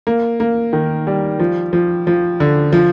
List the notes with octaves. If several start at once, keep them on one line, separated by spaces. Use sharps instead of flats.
A#3
A#3
D#3
G3
F3
F3
F3
D3
F3